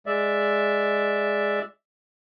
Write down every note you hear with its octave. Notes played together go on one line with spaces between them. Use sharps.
G#3 D5 E5